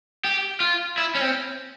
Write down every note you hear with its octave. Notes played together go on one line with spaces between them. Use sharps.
G4
F4
E4
C#4
C4